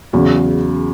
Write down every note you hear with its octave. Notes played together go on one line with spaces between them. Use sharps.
E2 C#3 F#3